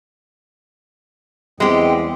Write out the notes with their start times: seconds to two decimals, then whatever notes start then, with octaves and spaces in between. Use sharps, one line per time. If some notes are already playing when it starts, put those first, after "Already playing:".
1.60 E2 G3 G#3 C4 G4 D#5